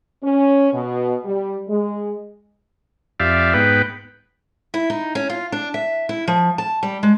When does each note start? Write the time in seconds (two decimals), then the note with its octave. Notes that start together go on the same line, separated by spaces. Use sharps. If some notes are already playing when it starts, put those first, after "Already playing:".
0.23 C#4
0.73 B2
1.25 G3
1.68 G#3
3.20 F2 G4 D5 E5 F5
3.54 G#2 B3 B4 G5
4.74 E4
4.90 D#4
5.15 C#4
5.30 F4
5.52 D4
5.74 E5
6.09 E4
6.28 F3
6.58 A5
6.83 G3
7.03 G#3